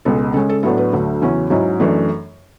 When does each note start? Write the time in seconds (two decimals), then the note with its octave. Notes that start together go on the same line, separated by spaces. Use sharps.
0.05 C#2 B2 G#3 A4
0.34 C#3 A4
0.36 G#3 C#4
0.49 A4
0.63 A2 F#3 B3 D4 A4
0.78 B4
0.93 D2 D3 F#3 A3
1.22 E2 C#3 F#3 C#4 E4
1.50 G#2 F#3 C#4 E4
1.80 F#2 E3 A3 D4